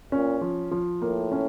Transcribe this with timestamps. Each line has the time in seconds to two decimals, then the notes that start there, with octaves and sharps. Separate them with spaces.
0.12 A#2 C#4
0.41 F3
0.71 F3
1.01 A2 A#3
1.32 C#4